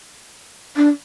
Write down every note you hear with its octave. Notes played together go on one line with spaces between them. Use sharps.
D4